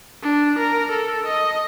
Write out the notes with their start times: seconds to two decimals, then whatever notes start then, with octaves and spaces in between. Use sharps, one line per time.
0.23 D4
0.58 A#4
0.92 A4
1.26 D#5